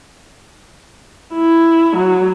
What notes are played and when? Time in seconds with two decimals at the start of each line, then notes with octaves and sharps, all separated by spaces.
1.34 E4
1.96 F#3